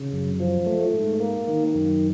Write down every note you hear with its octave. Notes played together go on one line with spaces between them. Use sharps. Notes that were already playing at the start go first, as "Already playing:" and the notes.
Already playing: C#3
F#2
F3
A3
G#2
A#3
D#3
F#2